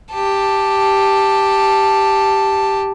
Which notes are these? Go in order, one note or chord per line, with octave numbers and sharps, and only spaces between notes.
G4 A5